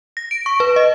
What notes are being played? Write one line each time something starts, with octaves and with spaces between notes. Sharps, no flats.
A#6
D7
C#6
B4
D#5